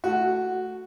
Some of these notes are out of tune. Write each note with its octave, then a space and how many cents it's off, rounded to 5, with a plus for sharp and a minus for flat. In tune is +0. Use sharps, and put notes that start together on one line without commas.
A3 +0 F#4 +0